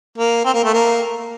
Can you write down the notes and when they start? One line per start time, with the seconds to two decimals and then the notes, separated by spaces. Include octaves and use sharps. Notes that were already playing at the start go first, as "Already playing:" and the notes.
0.18 A#3
0.45 C4
0.54 A#3
0.64 A3
0.73 A#3